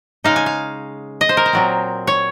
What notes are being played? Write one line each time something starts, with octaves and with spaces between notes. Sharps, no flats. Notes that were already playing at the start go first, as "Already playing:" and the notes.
C#3 G#3 D#4 F5
G#5
F5
D#5
C5
A#4
C5
A#2 F#3 C4
C#5